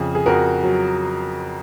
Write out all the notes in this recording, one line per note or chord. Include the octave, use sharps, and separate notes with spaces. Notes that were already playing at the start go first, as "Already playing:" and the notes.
Already playing: F2 C#3 G#4
G#4
F2 F#4 A#4
F#3